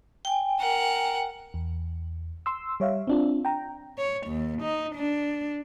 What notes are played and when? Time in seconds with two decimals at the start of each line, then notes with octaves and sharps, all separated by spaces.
0.25 G5 G#5
0.60 A#4 F#5
1.54 E2
2.46 C6 E6
2.80 G3 C#5 E5 F5
3.07 C4 D4 F4
3.45 G5 A#5
3.98 C#5
4.28 D#2
4.62 D#4
4.96 D4